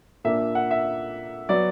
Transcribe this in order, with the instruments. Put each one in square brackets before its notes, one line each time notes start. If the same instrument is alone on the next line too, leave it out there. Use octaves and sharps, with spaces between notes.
[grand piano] A#2 A#3 D4 E5
F#5
E5
F#3 B3 D5